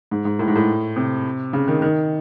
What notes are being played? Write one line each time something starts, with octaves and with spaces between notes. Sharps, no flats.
G#2
G#2
A2
G#2
A2
C3
C#3
D#3
D#3